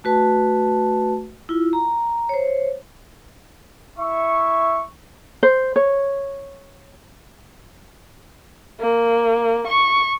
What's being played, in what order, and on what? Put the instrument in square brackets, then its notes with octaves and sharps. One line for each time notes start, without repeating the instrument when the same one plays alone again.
[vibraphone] A3 F#4 B4 A5
E4 F4
A#5
C5 C#5
[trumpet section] E4 E5 C#6
[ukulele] C5
C#5
[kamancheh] A#3
C#6